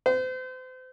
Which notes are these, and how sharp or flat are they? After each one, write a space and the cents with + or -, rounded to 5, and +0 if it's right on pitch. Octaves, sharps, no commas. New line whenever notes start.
C5 -35